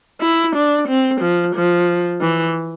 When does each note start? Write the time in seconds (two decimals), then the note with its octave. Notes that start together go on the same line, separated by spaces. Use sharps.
0.22 E4
0.56 D4
0.88 C4
1.21 F3
1.55 F3
2.21 E3